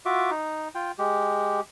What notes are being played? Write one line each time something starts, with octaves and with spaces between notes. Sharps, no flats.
F4 F#4 E5 D6
D#4
F4 G5
G#3 G4